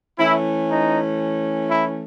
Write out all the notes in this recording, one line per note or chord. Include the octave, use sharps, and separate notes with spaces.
E3 A3 C#4 E4
D#4
E4